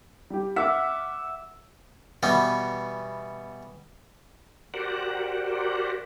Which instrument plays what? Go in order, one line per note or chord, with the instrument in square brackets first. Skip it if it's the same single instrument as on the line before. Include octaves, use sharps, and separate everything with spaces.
[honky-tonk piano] G3 G4
[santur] E5 D6 [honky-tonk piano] F#5 F6 B6
[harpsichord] B2 E3 G3 B3
[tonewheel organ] F#4 G4 A#4 C5 D5 F#5